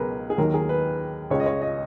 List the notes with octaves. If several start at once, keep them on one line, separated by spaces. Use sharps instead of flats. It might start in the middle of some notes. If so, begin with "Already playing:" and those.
Already playing: C#2 B2 F#3 G#4 A#4 B4
G#4
D#2 D#3 F#3 A#4
G#4
B4
C#2 C#3 G#3 C#5
D#5
C#5
D#5